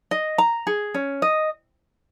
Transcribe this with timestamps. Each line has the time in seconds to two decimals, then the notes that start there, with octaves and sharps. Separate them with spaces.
0.11 D#5
0.38 A#5
0.67 G#4
0.94 C#4
1.22 D#5